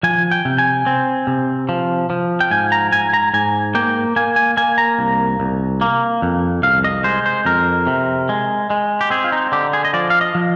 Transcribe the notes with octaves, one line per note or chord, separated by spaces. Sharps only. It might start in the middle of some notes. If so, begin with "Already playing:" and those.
F3 G#5
G5
C3
G#5
C4
C3
F3
F3
G5
G#2 G#5
A#5
G#2 G#5
A#5
G#2 G#5
A#3 G5
A#3 G#5
G#5
A#3 G#5
A#5
C2
C2
A#3
F2
C2 F5
D#5
G#3 C5
C5
F2 A#4
C3
G#3
G#3
G4
C4 G#4
F4
D#4
D3 G4
G#4
D#5
F3 D5
F5
D#5
F3